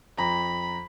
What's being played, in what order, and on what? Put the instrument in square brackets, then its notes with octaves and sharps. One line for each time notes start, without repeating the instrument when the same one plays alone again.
[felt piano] F2 A#5 [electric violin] B5